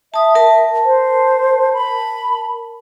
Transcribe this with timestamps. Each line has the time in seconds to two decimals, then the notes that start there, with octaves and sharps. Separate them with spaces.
0.14 E5 A5 D#6
0.35 A#4 A5
0.85 C5
1.73 B5